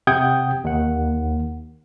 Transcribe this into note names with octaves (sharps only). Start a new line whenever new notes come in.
C3 F#5 G5 D#6 G6 G#6
D#2 F#5